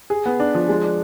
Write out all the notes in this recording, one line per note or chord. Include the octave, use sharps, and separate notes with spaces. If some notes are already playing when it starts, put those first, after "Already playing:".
G#4
B3
D4
F3
G#3
D4